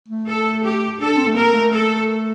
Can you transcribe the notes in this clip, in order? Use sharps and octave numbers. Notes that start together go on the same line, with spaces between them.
A3
A4
G4
D4 A4
C4
A3
A#3 A#4
A3
A4